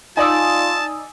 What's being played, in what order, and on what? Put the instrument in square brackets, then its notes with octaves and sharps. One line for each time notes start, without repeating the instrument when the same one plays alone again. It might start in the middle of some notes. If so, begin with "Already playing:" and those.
[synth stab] D#4 D5 [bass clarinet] F4 [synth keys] G#5 D#6 E6 [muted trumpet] A5